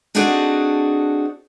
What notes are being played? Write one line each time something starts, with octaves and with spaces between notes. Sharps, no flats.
C4 D4 D#4 F#4 G#4 A4